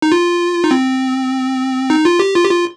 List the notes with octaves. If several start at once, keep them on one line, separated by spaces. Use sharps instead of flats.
D#4
F4
D#4
C4
D#4
F4
G4
F4
G4
F4